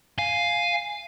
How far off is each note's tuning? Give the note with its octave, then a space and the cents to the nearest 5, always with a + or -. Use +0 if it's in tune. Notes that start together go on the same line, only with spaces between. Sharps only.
F5 +0 G#5 +0